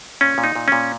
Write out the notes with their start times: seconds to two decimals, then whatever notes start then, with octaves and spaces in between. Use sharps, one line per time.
0.21 A#2 C#4
0.38 A#2
0.44 D#4
0.56 A#2
0.68 A#2 C#4